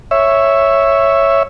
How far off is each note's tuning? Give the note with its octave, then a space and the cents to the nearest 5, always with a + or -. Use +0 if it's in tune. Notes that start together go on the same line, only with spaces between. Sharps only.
C#5 -5 E5 +0